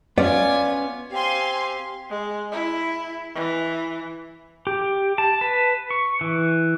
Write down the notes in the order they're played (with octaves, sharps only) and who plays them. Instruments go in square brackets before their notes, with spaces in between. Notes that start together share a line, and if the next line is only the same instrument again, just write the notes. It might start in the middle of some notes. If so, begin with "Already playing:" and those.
[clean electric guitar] B3 C#4 [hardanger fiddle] F4 G#5 [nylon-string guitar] D5
[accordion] C4 G4 [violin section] F5 G#5 C6
[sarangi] G#3
E4
E3
[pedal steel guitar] G4
A5
B4
C#6
E3